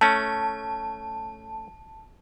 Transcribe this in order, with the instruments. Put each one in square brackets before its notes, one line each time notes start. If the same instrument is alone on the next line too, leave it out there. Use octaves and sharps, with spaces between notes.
[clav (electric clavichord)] A3 C#4 [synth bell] A5